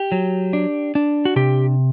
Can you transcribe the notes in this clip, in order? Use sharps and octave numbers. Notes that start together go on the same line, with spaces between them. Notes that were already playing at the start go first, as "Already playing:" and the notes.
Already playing: G4
F#3
D4
D4
F#4
C3 G4